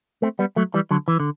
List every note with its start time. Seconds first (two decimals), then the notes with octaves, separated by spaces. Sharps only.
0.22 A3 C4
0.39 G3 B3
0.56 F#3 A3
0.74 E3 G3
0.91 D3 F#3
1.08 E3
1.20 D3